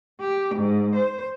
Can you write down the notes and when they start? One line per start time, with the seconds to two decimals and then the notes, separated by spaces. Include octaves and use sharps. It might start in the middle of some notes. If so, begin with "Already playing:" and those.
0.20 G4
0.55 G#2
0.96 C5